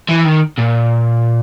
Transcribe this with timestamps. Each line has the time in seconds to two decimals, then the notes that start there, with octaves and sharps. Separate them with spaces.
0.09 E3
0.25 D#3
0.58 A#2